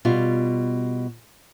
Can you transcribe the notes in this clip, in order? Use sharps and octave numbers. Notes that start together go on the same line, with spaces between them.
B2 G3 F4